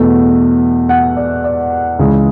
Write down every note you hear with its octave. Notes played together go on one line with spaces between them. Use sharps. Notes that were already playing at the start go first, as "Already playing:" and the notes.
Already playing: E2 B2 A3
F#5
D5
D5
C#2 C#3 E3 G#3